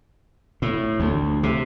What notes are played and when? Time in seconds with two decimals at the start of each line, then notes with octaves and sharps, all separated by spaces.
0.62 A2
1.00 D2
1.43 C3